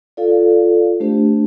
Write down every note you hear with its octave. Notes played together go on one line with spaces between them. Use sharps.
F4 A4 D5 F5
A3 D4 G4 C5